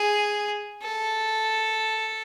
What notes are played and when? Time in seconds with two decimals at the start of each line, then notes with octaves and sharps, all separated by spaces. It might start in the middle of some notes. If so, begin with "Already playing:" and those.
Already playing: G#4
0.83 A4